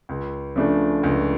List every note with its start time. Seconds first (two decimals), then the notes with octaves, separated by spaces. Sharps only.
0.09 C#2
0.56 C#3 F3 A3 D4
1.03 C#2